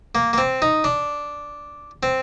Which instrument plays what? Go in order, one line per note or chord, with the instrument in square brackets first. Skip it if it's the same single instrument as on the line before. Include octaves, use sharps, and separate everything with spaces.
[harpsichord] A#3
A#3
C4
D#4
D4
C4